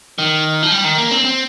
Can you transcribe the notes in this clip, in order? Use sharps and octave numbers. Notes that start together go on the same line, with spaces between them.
D#3
F3
G3
D#3
A#3
C4
C4